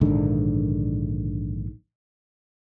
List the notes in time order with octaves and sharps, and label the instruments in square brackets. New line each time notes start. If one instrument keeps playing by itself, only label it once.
[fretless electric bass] A#1 G#2 D3 D#3